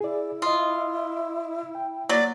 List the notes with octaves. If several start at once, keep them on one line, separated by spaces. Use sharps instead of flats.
E4 G#4 D5
F4 D#5 D#6
G5
F#3 A#3 D5